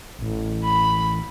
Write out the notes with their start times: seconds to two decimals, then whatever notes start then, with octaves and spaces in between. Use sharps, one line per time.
0.19 A1
0.63 B5